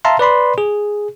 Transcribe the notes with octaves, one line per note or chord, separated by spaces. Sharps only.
E5 F5 A5 A#5 C6
B4 D5 B5 C6
G#4